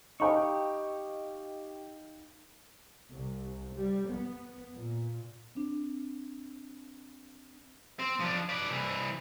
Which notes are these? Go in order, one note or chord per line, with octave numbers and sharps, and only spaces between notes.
D#4 G4 D#5 F5 G5 B5 C#6
C2
G3
B3
A#2
C4 D4
C4
F3 D4
B4 D5
C2 E3